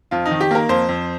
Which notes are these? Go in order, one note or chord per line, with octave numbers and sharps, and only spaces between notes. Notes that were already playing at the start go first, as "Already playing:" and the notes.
F2 F4
D#4
D#3
G4
A#3 A#4
F2 C5
F2